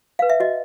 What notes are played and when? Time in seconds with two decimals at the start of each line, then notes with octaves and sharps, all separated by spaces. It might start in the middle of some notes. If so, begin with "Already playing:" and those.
0.19 B4 F5
0.30 E5
0.40 F#4 D#5